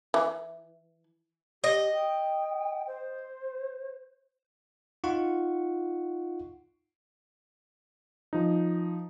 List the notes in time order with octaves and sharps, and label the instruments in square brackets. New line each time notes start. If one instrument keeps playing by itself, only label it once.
[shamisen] E3
[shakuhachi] G4 [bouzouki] D#5
[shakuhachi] G5
C5
[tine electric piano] D#4 F4 F#5 C#6
[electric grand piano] F3 D#4